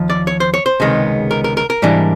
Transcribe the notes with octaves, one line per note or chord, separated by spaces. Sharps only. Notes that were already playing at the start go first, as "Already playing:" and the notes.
Already playing: D#2 F3
D5
C#5
C5
C#5
C5
C#2 C3 D#3 G#3 B3
A#4
A#4
A#4
A#4
G#2 E3 G3 A#3 D4